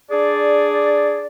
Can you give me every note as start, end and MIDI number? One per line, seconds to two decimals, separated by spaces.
0.11 1.27 62
0.11 1.27 68
0.11 1.27 74